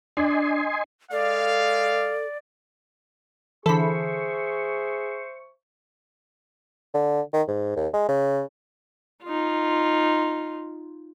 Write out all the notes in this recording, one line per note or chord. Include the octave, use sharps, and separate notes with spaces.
D4 D#5 G#5 C6
G#3 A4 D5 F5
D3 E3 G#4 A4 C5 E5 B5 C#6
D3
D#3
G#2
D#2
G#3
C#3
D#4 F4